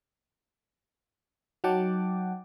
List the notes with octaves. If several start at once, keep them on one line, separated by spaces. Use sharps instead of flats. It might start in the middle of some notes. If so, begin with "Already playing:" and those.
F#3 D#4 F#5 G5 A5 D6